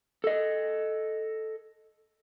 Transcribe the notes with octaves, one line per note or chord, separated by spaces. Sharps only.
A4 D#5